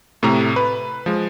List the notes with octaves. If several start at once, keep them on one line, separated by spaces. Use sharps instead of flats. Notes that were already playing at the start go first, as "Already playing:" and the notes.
A2 C3 A3 A#5
B4
F3 G#3